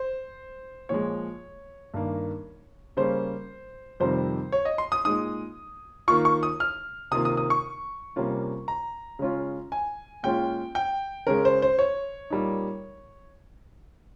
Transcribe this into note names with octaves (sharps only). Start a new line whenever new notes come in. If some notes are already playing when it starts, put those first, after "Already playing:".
Already playing: C5
A#2 F3 G#3 C#5
G2 D#3 A#3
C#3 G3 A#3 C#4 C5
F2 C3 D#3 G3 C4 C5
C#5
D#5
C6
D#6
A#2 G#3 D#4 D#6
D#3 A#3 F4 C#6
C#6
D#6
F6
C3 D#3 A#3 F4 D#6
D#6
D#6
C#6
C3 G3 A#3 C#4 F4
A#5
C#3 G#3 C#4 F4
G#5
A#2 G#3 C#4 F4 G5
G5
C#3 G#3 C#4 A#4
C5
C5
C#5
A#2 G3 A#3 D#4